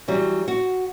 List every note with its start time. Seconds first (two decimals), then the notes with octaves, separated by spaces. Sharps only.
0.08 E3 F#3 G3
0.48 F#4